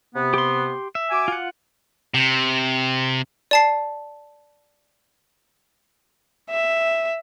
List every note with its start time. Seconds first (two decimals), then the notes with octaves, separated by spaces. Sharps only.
0.15 C3 B3
0.34 G4 C6
0.95 E5
1.11 F#4 G#5 D6
1.28 F4 F#5
2.14 C3
3.51 D5 A5 C7
6.50 E5